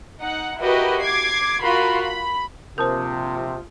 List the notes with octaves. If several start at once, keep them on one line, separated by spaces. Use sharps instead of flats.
D#4 F#5
E4 F#4 G4 A#4 B4 D#5
D6 G#6 C7
F4 F#4 A#4 B5 C6
B5
A#1 C3 F4 A#4 C5 A5 D#6 G6